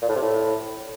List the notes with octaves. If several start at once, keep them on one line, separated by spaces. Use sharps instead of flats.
A#2
A2
C3
A2